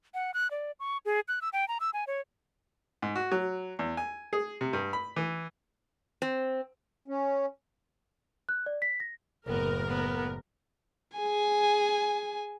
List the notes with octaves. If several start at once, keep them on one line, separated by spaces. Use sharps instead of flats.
F#5
F#6
D5
C#6
G#4
F#6
E6
G5
A#5
E6
G#5
C#5
G#2
F#4
F#3
E2
G#5
G#4
C3
G2
B5
E3
C4
C#4
F#6
D5
B6
A#6
F#1 A2 B3 A#4
B3
G#4 G#5